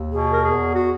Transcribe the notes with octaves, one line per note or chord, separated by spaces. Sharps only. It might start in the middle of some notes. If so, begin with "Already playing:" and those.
Already playing: D#2
B2 G#4
A#4
E2 G#4
F#4